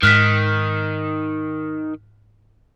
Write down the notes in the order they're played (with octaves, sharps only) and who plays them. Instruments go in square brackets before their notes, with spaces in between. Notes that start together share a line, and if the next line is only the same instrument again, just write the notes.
[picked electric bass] G#2 [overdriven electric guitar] D#3 [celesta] F6 F#6 B6